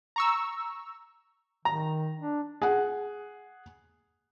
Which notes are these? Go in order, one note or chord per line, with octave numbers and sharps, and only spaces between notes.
A#5 C#6 E6
D#3 A#5
D4
G#4 F#5